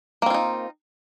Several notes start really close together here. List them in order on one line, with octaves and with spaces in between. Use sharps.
A#3 C4 F4 D#4